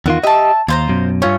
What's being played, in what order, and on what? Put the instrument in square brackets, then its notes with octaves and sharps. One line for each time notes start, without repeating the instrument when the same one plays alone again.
[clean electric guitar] E2 D#3 F4 [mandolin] F#4
[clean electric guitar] G4 D#5 [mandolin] E5 A5
[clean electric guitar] D#2 [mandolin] F4 C5 A#5
[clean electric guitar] F#2 B2
[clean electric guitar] G2 F4 C#5 [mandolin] A3 C#4